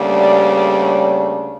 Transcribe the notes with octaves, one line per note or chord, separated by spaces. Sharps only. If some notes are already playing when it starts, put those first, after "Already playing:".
Already playing: D2 C#3 G3 A#3 D4
D5
C#5